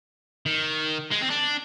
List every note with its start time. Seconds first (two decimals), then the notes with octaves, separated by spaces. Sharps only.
0.46 D#3
1.12 G#3
1.22 C4
1.31 D4